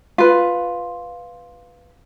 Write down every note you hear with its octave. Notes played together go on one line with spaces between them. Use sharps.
F4 B4